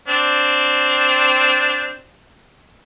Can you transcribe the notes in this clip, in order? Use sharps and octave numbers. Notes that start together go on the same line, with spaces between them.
C4 D4